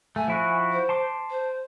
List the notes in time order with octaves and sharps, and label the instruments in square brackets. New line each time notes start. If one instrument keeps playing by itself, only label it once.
[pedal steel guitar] A3 [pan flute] G#5
[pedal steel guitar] F3 E4 F#4
[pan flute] C5
[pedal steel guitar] A5 C6 D6
[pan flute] C5